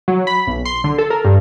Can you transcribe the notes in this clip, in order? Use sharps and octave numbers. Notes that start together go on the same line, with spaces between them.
F#3
B5
B1
C6
D3
A4
A#4
G2